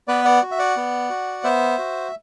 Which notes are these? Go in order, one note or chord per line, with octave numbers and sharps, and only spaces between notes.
B3 B4 D5
D5 F#5
F#4
E5
D5 F#5
B3
F#4
B3 C5 E5
F#4